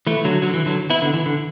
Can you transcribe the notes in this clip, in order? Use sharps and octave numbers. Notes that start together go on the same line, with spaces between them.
E3 A3
D3 F#3
D3 F#3
E3
D3 F#3
B3 E4
D3
E3
D3